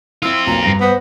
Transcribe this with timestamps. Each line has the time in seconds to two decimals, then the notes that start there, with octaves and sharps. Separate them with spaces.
0.22 C4 E4 F4 E6
0.47 B1 A#2 A#5
0.63 G2 A#6
0.81 B3 C5